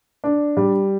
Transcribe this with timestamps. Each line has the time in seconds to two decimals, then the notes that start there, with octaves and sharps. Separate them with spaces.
0.24 D4
0.57 G3